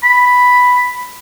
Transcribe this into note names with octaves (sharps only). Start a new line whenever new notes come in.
B5